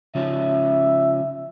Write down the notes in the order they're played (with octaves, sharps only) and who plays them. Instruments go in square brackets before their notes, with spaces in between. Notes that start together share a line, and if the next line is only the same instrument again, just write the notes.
[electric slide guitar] C#3 F3 C#4 [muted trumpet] E5